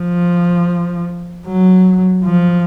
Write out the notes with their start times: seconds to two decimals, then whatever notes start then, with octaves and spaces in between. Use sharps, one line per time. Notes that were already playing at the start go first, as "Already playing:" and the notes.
Already playing: F3
1.46 F#3
2.25 F3